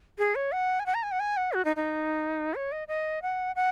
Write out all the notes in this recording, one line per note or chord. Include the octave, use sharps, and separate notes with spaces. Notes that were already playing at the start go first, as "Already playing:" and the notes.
G#4
C#5
F#5
G#5
F#5
A#5
G#5
F#5
G#5
F#5
F#4
D#4
D#4
C#5
D#5
D#5
F#5
F#5